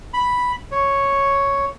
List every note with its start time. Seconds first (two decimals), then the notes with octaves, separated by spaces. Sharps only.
0.14 B5
0.72 C#5